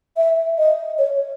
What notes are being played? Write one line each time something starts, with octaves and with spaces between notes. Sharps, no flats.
E5
D#5
C#5